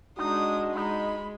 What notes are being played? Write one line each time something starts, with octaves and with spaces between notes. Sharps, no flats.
G#3 D4 D#4 F#4 D#6
G#3 D#4 B5